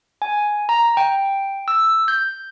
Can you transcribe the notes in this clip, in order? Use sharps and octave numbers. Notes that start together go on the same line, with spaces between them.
G#5
A#5
G5
E6
G6